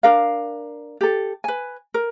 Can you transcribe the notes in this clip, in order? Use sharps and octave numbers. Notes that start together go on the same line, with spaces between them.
D4 A#4 F5
G4 A4
B4 G#5
A#4